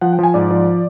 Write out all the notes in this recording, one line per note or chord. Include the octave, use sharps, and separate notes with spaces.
F3 F#5
G5
F3 G#5
G#2 D5
F3